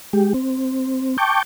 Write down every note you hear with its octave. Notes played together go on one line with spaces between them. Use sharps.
G#3 G4
C4
G5 A5 C#6 D6 G6